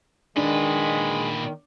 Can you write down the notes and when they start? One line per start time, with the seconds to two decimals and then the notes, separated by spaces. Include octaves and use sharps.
0.36 A#2 D#3 G#3 D4 B4